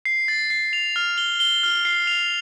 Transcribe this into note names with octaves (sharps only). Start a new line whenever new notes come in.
C7
A6
C7
F7
F6
G7
G7
F6
C7
F7